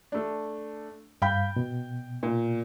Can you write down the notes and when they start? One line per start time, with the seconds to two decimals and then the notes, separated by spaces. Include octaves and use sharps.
0.12 A3 D4
1.22 G2 F5 G5 B5 G6
1.56 B2
2.23 A#2